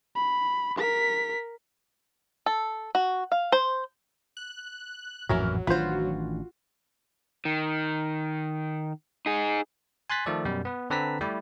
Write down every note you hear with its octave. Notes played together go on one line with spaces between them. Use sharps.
B5
A#4 B6
A4
F#4
F5
C5
F#6
A1 F2 G#2 E3 F#3 C#4 A#4
A1 D#3 D4 F4 F#4 B4 C5
D#3
D#4 G#4
G#5 C6 F#6 A6 B6
D#3 F3 A3 A4 D5
F#2 B2 G3
B3 B4
D3 C4 B4 A5 A#5 B6
G3 A3 E4 G4